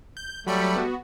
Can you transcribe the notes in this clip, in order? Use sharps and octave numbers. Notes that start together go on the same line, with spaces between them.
G6
F#3 G3 A3 B5 C#7
B3 F#4